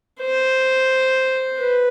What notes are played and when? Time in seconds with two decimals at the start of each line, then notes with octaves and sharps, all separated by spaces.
0.21 C5
1.59 B4